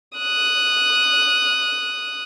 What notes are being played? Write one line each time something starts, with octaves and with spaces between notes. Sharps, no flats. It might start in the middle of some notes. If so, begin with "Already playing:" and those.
D#6 F#6